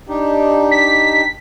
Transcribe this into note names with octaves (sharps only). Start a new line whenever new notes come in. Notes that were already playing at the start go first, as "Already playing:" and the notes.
D4 D#4 G4
B6